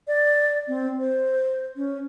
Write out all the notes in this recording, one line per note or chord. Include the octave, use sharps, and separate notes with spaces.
D5
C4
C5
C#4